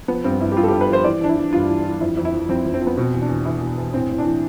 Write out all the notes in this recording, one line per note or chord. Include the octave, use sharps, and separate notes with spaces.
F3 B3
G2 C4
G2 E4
G4
G2 F4
A4
G4
G2
B4
F3 C5
E3 D5
E3 D4
E4
E3
G2 F4
E3
E3
F2 E4
F2
E4
F3
F2 C4
F2
C4
F3
B3
B2 C4
E2
D4
E2
E2 E4
B2
E2
A2 C4
A2
D4
E3